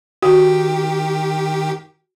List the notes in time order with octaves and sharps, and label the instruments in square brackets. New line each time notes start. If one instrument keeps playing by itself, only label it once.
[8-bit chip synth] D#3 G4 [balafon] F#4